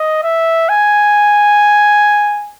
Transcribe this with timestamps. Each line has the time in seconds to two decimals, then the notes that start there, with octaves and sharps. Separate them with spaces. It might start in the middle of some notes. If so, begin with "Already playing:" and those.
Already playing: D#5
0.23 E5
0.69 G#5